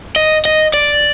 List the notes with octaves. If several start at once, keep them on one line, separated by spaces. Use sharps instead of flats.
D#5
D#5
D5